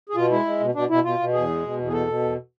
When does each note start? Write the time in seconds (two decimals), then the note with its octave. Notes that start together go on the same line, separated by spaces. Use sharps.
0.09 G#4
0.15 B2 F4
0.30 G#3 E4
0.45 G#3
0.60 B2
0.74 B2 D4
0.89 B2 E4
1.04 B2 F4
1.19 B2
1.33 E2 G#4
1.48 G#3
1.63 B2
1.78 E2
1.87 G#4
1.92 B2 A4
2.07 B2
2.22 E2